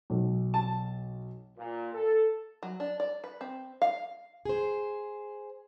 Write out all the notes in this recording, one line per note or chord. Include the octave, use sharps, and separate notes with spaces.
B1
A5
A#2
A4
F#3
D4
D5
B4
C4
F5
G#4 C5